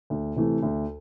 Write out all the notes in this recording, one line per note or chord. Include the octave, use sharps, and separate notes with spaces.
D2
C3 E3 A3
D2